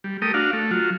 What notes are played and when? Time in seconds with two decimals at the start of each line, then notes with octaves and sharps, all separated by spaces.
0.04 G3
0.22 A3 G4 A#4 D#6
0.34 D4 F#4 F5
0.53 A3
0.71 F#3 F4